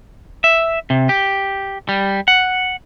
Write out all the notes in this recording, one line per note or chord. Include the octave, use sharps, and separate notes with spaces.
E5
C3
G4
G3
F#5